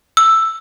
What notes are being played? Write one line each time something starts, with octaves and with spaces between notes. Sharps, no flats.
E6